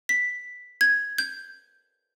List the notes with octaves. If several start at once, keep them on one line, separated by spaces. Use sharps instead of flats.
B6
G#6
G6